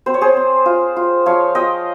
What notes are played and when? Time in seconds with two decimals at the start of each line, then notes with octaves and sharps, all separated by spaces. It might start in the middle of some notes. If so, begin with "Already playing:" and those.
0.06 C4 C5
0.14 C#5
0.21 G#4 C5
0.36 C4
0.66 F4
0.97 F4
1.26 F3 C#5 F5
1.55 F4 D#5 G5